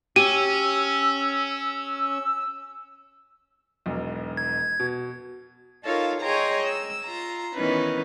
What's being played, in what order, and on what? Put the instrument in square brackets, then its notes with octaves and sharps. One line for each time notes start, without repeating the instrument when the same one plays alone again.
[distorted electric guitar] C#4 [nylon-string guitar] G4 [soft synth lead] E6 [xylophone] D#7
[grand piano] E1 B1
[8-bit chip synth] G#6
[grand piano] B2
[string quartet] D#4 F4 A4 A#4 C#5 F5
G#4 C#5 D#5 G5 A#5 C6
E6
F4 A#5
D#3 E3 B3 C#4 D#4 B4